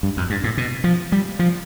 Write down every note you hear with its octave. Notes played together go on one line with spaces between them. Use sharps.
G2
F2
G2
A2
B2
F3
G3
F3